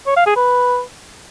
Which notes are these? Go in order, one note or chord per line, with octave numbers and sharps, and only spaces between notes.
C#5
F5
G#4
B4